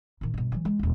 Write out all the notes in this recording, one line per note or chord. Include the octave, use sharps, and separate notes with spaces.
A#2 D#3
G2 B2
E3 F#3
G#3
D#1 C#2